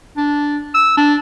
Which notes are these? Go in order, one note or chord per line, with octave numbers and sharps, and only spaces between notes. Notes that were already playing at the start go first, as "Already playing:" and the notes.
D4
E6
D4